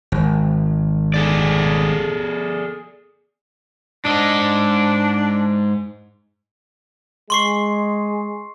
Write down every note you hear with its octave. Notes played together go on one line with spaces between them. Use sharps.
G#1
G#4 A4 D5
G#2 D4 D#5
G#3 C6 C#6 C7